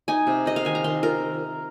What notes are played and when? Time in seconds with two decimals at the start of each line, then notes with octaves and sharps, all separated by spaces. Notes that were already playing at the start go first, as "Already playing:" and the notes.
0.08 D#4 G#5
0.27 C3
0.46 D#4 D#5
0.56 F5
0.65 D#3 G#5
0.75 A#5
0.84 D#3 C6
1.03 F4 A#4